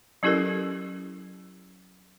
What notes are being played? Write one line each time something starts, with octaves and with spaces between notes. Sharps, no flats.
F#3 C#4 E4 G4 A4 A#4